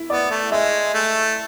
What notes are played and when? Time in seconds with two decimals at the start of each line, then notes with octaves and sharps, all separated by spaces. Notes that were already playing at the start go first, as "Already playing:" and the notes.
Already playing: E4
0.10 B3 D5
0.31 A3
0.52 G#3 E5
0.94 A3